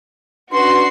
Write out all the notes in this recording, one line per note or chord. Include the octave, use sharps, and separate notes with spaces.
C#4 D4 F#4 B4 C6 C7